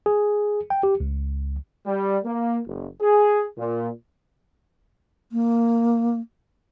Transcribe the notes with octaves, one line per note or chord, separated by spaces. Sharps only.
G#4
G5
G4
C#2
G3
A#3
F#1
G#4
A#2
A#3